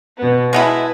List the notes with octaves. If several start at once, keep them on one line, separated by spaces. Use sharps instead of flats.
B2 B3
G#3 B3 E4 B4 A5